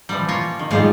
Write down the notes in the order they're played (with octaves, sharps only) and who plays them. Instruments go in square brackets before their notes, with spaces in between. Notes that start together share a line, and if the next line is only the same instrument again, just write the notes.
[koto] E3 F3 G3
A#3 F4 C#5
D#3
[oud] G#2 F3 G#3 [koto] G3 F4 F5